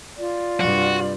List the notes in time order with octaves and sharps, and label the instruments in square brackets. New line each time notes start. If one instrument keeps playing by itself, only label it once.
[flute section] F4 D5
[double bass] G2 C3 [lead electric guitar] F#4